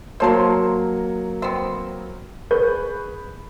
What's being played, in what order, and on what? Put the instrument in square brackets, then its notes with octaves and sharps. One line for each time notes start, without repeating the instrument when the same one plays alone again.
[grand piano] F#3 A#3 C#5 [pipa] C5 A5 C6
[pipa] B3 C4
[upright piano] G#4 B4 C#6 G6